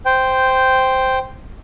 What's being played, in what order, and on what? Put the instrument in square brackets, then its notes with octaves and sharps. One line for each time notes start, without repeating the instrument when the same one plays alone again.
[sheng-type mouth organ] C5 G5